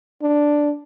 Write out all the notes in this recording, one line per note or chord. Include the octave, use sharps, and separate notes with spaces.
D4